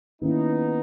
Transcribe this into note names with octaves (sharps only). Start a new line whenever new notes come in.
D#3 A#3 B3 C#4 D#4 E4